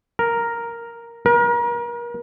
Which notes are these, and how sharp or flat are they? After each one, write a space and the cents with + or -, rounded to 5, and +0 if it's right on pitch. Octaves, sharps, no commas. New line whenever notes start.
A#4 +0
A#4 +35